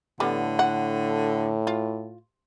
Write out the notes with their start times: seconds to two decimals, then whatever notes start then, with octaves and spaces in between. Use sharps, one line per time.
0.20 A2 D3 G3 B3
0.59 F#5
1.67 F4